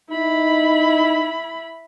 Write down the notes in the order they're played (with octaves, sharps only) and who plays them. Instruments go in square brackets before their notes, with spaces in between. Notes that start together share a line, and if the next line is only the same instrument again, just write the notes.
[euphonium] D#4 [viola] E4 B5